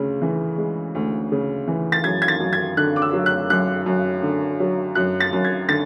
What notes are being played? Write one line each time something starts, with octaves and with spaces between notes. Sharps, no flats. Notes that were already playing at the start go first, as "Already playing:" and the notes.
Already playing: D2 C#3
E3
G#3
D2
C#3
E3
A6
F#2 G#6
G#6
A6
F#2
G#6
D3 F#6
D6
E6
F#3
F#6
F#2 F#6
F#2
D3
F#3
F#2 F#6
A6
F#2
G#6
D3 A6